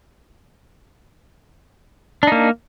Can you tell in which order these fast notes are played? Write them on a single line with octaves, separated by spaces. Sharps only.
D4 D#4 A#3